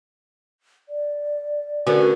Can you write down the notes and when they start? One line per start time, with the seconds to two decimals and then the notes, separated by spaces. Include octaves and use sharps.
0.89 D5
1.87 D3 B3 C#4 F#4 A#4